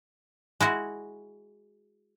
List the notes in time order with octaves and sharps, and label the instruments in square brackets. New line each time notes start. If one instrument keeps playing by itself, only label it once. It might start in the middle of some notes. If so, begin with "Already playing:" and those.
[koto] G#3 E4 F#4